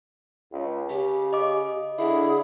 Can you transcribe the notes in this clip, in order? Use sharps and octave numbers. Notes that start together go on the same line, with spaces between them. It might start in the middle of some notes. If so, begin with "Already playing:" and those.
C#2
C#3 G4
D#5 D6
D3 E4 G#4